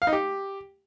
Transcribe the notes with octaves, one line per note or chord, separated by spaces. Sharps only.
F5
D#4
G4